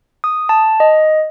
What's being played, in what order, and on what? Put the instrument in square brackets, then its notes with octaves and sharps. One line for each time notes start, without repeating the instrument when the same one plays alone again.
[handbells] D#6
A5
D#5